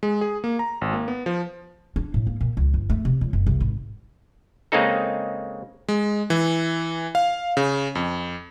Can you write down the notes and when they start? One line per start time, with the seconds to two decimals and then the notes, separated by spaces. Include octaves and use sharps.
0.03 G#3
0.21 G#4
0.44 A#3
0.59 A#5
0.81 G#1
0.93 A#3
1.08 B3
1.26 F3
1.96 D4
2.14 A2
2.27 A#3
2.41 A#2
2.57 C#2
2.74 G1
2.90 A3
3.05 C3
3.21 C#2
3.33 F#1
3.47 C2
3.60 G#1
4.72 C#3 G#3 A#3 C4 D#4 A4
5.88 G#3
6.30 E3
7.15 F5
7.57 C#3
7.95 F2